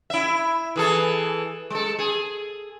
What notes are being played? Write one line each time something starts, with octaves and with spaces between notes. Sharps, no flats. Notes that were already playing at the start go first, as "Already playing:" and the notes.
E4 E5
E3 G#4 A4
G#3 A4
G#4